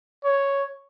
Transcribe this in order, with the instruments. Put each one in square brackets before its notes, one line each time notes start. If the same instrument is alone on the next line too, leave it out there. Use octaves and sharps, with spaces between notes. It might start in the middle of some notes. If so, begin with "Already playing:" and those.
[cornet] C#5